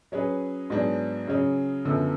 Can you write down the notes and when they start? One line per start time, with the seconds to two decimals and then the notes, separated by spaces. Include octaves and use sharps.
0.12 F#3 C#4 G#4 B4
0.70 G#2 F#3 B3 D4 G#4
1.27 C#3 F#3 C#4 G#4
1.85 F#2 D3 F3 B3